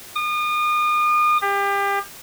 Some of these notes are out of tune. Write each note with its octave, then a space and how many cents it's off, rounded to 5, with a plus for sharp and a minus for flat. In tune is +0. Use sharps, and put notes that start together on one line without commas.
D#6 -40
G4 +30